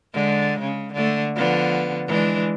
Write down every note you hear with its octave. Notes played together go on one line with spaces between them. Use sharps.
D3 G#3
C#3
D3 A3
D3 F3 B3
E3 G#3 D4